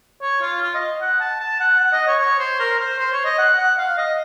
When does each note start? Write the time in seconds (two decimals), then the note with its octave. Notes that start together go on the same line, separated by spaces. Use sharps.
0.22 C#5
0.42 F4
0.62 F4
0.74 D#5
1.01 F#5
1.21 A5
1.40 A5
1.60 F#5
1.80 F#5
1.93 D#5
2.07 C#5
2.20 C#5
2.39 C5
2.60 A#4
2.79 C5
2.99 C5
3.12 C#5
3.25 D#5
3.38 F#5
3.58 F#5
3.78 F5
3.97 D#5